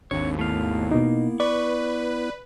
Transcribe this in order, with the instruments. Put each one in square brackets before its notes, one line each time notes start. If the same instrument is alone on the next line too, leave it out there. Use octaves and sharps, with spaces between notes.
[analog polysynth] G#1 D#2 [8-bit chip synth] C4 D4 [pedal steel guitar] C#5
[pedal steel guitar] A3 F5 [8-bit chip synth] B3 E4
[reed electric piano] B2 D#4 [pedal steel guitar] A#3
[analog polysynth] B4 [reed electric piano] D5 [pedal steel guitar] C#6